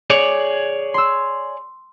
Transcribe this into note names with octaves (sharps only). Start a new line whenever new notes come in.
G#4 C#5 D5
C6 E6